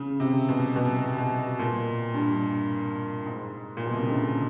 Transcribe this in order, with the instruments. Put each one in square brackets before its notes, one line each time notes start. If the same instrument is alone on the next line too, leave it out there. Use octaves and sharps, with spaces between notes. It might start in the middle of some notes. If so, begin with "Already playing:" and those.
Already playing: [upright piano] C#3
C3
B2
B2
B2
A#2
G2
G#2
A#2
B2
C3
C#3
D3